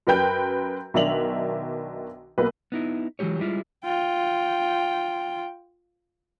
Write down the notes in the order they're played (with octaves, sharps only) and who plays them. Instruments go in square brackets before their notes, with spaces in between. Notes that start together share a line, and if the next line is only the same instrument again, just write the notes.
[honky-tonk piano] F#2 A#4 B4 G5 G6
B1 D#3 D4 E5 F7 F#7
B1 A#3 B4
[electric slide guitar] B3 D#4 E4
E3 F#3 G#3 G4 C#5
G3 G#3 E4 F4
[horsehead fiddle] F4 G5